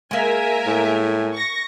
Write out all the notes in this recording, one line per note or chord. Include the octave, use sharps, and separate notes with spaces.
G#3 A#3 A#4 E5 G#5
A2
C#6 A#6